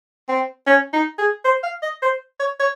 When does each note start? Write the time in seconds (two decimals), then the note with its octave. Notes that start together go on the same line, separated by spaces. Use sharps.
0.29 C4
0.67 C#4
0.93 D#4
1.18 G#4
1.45 C5
1.63 F5
1.82 D#5
2.02 C5
2.40 C#5
2.60 C#5